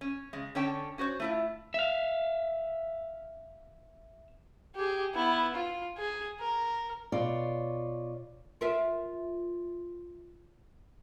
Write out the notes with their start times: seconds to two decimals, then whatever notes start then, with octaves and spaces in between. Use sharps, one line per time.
0.01 C#4
0.33 C#3 G#3
0.55 D3 C#4 A4 C#5 G5 A5
0.98 C#4 F#4 C5 C#5
1.20 A3 E4 F4
1.74 E5 F5
4.75 G4 G#4
5.14 B3 E4
5.54 F4
5.98 G#4
6.40 A#4
7.12 B2 F4 C#5 D5
8.61 F4 A#4 E5